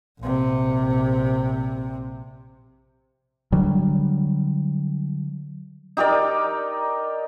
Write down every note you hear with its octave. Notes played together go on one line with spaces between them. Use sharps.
A#1 C3
D3 F#3 G3
D#4 G4 A#4 D5